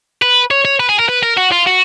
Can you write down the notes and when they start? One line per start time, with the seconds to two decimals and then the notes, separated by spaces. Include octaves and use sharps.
0.22 B4
0.51 C#5
0.65 C#5
0.80 B4
0.89 G#4
0.99 A#4
1.09 B4
1.23 A#4
1.37 F#4
1.51 F4
1.66 F#4